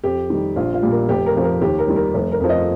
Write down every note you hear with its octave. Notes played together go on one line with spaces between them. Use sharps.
F2 G4
D#3 G3
A#1 F4
F4
A#2 G3
A#4
F1 G4
A#4
F2 F3
A#4
D#2 G4
A#4
D#3 G3
A#4
F1
A#4
F2 F3
D#5